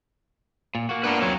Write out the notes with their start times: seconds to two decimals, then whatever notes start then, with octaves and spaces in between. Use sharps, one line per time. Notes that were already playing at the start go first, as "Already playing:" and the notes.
0.75 A#2
0.89 A#3 F#4
1.04 B3 D4 B4 G5 A#5
1.20 F#3 C4 C#5 D6